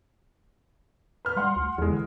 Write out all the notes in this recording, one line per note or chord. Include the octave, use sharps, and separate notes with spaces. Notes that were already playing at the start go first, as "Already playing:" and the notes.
B4 F6
G3 F#5 C6
D2
E2 E3 G#3
D3